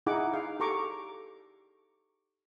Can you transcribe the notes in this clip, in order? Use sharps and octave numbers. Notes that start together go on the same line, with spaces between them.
D#4 E4 G#4 F#5 D6
F5
G4 A4 A#5 C#6 D6